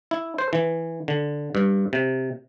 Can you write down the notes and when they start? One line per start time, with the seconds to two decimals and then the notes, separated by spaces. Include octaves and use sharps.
0.11 E4
0.38 C5
0.53 E3
1.08 D3
1.55 G2
1.93 C3